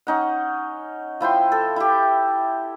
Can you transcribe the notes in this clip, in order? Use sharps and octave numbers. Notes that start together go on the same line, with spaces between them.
C#4 D#4 F#5
F3 E4 G5 C6
A4
E4 G4